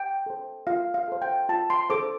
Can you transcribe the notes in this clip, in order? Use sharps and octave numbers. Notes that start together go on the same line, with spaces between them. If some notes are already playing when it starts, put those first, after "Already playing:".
Already playing: G5
A4 C5
F4 F5
F5
A4 C5
G5
F4 A5
C6
A4 C5 D6